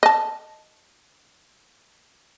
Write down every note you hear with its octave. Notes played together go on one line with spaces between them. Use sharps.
D#5 A5